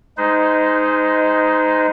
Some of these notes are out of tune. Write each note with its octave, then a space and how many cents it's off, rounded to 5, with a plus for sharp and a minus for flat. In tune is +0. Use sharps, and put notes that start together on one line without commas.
G#3 +0 D#4 +5 C5 -30